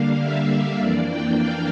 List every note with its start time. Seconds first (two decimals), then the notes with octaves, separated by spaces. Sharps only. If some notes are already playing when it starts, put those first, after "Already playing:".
Already playing: D3 G3 A#3 D4 F5
0.22 E5
0.81 F2 E3 A#3 D4 D5
1.10 G5
1.39 F5